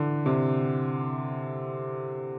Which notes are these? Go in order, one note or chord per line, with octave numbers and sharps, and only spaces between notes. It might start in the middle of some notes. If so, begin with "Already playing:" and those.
Already playing: D3 E3
C3